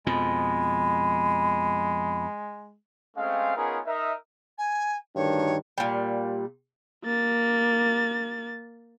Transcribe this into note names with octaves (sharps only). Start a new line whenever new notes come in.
F2 B2 F3 G#3 B5
G#3 A3 C4 C#4 F5
B3 C#4 D#4 F4 G#4 A#4
D#4 A#4 D#5 E5
G#5
D2 G2 D#3 C#5
A#2 G3
A#3 A6